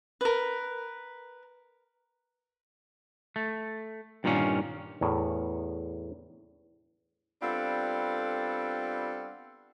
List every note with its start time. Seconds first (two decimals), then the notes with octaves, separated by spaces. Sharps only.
0.21 A#4 B4
3.36 A3
4.24 G2 A#2 D#3 A#3 C#4
5.01 E2 A2 A#4
7.42 G3 B3 C4 D4 F4 A4